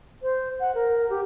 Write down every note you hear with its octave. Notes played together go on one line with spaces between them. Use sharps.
C5
F#5
A#4
G4